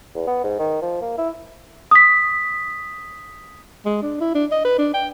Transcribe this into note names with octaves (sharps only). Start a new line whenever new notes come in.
E2
B3
G#2
D#3
F3
A#3
E4
D#6 B6
G#3
D4
E4
D4
D#5
B4
D4
G5